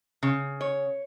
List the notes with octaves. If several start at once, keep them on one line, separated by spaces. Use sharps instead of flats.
C#3
C#5